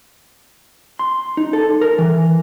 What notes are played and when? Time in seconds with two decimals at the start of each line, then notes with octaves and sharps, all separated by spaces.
0.99 C6
1.37 D#4
1.53 A4
1.81 A#4
1.98 E3